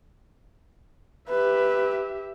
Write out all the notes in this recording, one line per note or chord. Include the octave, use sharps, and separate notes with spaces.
G4 B4 E5